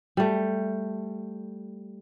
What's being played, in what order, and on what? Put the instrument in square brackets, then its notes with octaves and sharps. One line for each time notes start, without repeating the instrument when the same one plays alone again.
[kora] G3 A3